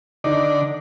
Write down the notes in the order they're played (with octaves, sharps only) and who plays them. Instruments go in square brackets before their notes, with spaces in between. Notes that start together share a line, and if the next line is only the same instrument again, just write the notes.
[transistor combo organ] D3 D4 [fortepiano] D#4